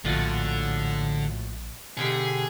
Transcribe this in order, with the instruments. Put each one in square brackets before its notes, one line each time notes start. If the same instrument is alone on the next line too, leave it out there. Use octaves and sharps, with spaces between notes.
[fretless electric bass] A#1 [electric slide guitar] A2 F4 F#4 [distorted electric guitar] D3
[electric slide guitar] B2 D3 G4 [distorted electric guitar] G#4